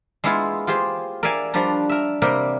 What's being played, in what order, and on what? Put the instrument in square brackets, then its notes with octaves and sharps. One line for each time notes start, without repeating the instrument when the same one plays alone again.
[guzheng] G#3 A#3 B3 E4 F4
F4 G4 G#4 C5
A#4 D5 E5 F5 G#5
F3 G3 D4 A#5
A#4 E5
C3 G3 A#3 G4 A#4 G5